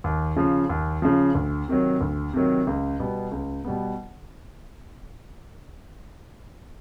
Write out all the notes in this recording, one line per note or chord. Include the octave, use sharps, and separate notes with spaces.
D#2
C#3 F3
D#2
C#3 F3
D2
C3 D#3 F#3
D2
C3 D#3 F#3
C#2
B2 G3 B3
C#2
B2 G3 B3